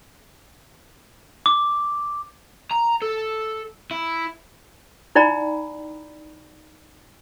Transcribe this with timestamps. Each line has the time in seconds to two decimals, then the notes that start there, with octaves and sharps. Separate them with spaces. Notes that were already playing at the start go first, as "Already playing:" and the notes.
1.46 D6
2.71 A#5
3.02 A4
3.91 E4
5.15 D#4 E4 D5 G5 A#5 B5